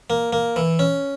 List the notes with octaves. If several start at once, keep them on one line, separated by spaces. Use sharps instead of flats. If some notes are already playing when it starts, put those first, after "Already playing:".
A#3
A#3
E3
C#4